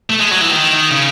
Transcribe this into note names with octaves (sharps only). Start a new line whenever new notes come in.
A3
G#3
F#3
E3
D#3
C#3